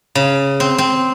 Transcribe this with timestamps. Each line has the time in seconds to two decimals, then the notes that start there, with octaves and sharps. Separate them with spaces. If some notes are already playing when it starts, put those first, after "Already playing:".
0.15 C#3
0.60 C4
0.78 C4